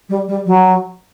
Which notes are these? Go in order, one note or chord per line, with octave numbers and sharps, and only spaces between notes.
G3
G3
F#3